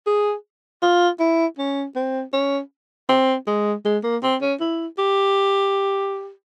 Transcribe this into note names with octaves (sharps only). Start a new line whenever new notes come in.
G#4
F4
E4
C#4
C4
C#4
C4
G#3
G#3
A#3
C4
C#4
E4
G4